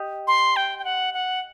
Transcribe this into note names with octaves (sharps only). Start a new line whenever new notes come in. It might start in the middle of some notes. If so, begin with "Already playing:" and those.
Already playing: G4 D#5
C6
G5
G5
F#5
F#5